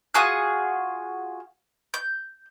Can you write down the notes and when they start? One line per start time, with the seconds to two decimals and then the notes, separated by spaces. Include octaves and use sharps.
0.14 F4 F#4 G#4 F#6
1.94 G6